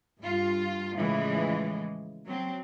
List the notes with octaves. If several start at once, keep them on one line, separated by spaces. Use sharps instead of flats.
G2 F4
A2 C#3 E3 F3 G#3
F#3 C4